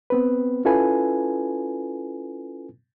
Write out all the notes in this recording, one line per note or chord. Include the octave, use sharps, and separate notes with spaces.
B3 C4 B4
C#4 E4 F4 A4 B4 G#5